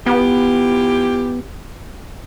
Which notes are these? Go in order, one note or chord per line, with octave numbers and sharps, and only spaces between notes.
E3 B3 F4 G4